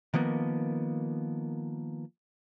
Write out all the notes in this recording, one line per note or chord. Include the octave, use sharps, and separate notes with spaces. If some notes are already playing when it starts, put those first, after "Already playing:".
D#3 F3 A#3 B3